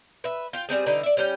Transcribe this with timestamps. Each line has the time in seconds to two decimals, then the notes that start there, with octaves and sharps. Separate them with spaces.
0.24 B4 E5
0.53 F4 G5
0.69 G3 G#3 C4 G#4
0.86 D3 E3 G3 D#4
1.03 D5 E5
1.17 G3 C#4 F#5 G5